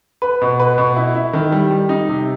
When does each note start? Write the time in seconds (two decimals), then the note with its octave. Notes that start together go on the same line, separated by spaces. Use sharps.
0.22 B4
0.42 B2
0.60 B4
0.78 B2
0.96 E4
1.15 E4
1.33 D#3
1.52 G3
1.71 G3
1.89 D#4
2.09 C3